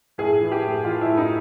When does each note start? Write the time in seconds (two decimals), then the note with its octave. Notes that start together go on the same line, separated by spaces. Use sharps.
0.18 A2 G#4
0.41 E3
0.51 G4
0.63 A2
0.84 E3 F4
1.01 A2 E4
1.17 D#4